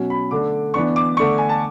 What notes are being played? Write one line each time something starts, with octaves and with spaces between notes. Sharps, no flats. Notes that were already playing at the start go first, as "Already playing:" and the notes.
Already playing: B2 F#3 C#4
B5
D3 A3 D4 D6
E3 B3 D4 C#6
D6
D3 A3 D4 C#6
G#5
A5